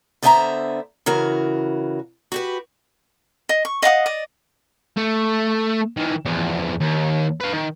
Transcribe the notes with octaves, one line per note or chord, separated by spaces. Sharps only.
D3 B3 C5 E5 G5 A#5
C#3 E3 F#4 A#4
F#4 G4 B4
D#5
C#6
D#5 F5 F#5 D#6
D5 D#5
A3
D#3 E3
E2 F3
D#2
B4 F5
D#3